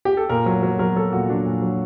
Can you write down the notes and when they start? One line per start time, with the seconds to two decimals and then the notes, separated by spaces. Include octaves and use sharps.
0.05 G4
0.17 A4
0.29 A#2 A#4
0.46 F#3
0.63 F#3
0.79 F#3 A#4
0.96 F#3 A4
1.12 A#2 F#4
1.29 F#3 D4
1.46 A#2
1.62 F#3